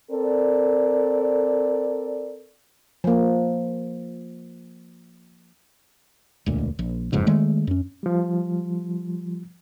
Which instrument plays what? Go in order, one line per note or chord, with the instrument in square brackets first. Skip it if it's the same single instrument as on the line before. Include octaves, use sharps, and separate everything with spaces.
[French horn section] C4 A4 A#4 D5
[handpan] F3 A#3
[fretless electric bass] E1 D2 A#2
A#1
F#1 F2 G#2 C#3
D#3 G#3 A3
F#2 C#4
[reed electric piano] F3 G3